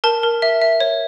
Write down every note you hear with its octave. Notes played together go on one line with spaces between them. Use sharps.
A#4 A5
A#4
E5
E5
C#5